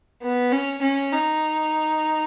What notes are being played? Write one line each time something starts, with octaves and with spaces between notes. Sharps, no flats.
B3
C#4
C#4
D#4